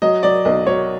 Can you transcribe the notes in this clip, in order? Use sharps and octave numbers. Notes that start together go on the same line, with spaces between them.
F#3 D#5
F#3 D5
B1 D#5
F#3 C#5